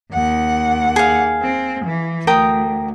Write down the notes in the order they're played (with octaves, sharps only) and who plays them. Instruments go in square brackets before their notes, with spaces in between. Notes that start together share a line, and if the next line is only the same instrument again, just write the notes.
[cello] D#2 F#5
[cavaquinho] G#4 F5
[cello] C4
E3
[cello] D2 [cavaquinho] A#4 G5 D#6